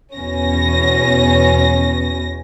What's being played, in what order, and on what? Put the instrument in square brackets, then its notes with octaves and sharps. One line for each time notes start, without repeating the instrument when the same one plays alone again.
[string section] E2 B2 C#4 A#6